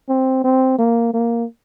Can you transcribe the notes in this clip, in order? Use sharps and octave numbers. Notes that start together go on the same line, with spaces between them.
C4
C4
A#3
A#3